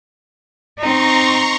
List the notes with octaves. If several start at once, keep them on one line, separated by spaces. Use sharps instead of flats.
C4 D#4 A#5 C6 C#6